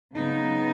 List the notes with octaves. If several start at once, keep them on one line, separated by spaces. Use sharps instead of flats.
C#3 F#3 B3 D#4